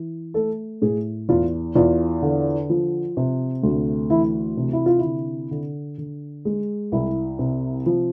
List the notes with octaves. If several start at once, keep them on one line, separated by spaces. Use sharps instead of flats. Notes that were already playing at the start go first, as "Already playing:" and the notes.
Already playing: E3
A3 A4
A2 G#4
E2 F4
E2 F4
D3
F3
C3
D2
E3 E4
C3
E4
F4
E4
D3
D3
D3
G#3
C2 E4
C3
F3